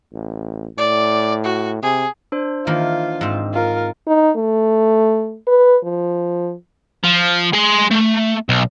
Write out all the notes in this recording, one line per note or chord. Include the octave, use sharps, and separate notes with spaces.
A1
A2 D5
F#4
C3 G#4
D4 C5
D#3 E3 A#3 F4
G#2 C4
F4 A#4
D#4
A3
B4
F3
F3
G#4 C6
A3
B1